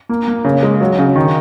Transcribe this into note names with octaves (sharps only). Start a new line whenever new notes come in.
A#3
A#3
C#3
G#3
F#3
C#3
D#3